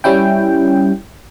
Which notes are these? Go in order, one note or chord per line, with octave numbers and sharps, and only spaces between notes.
G3 C#4 E4 G5